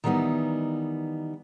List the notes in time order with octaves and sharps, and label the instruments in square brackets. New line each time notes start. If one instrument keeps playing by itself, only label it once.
[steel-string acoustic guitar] D#3 E3 G3 B3 D#4